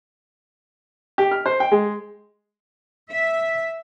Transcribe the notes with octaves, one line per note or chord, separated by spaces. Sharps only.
G4
F6
C5
G5
G#3
E5